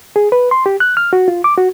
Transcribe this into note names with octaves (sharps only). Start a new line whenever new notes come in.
G#4
B4
C6
G4
F#6
F6
F#4
F4
D6
F#4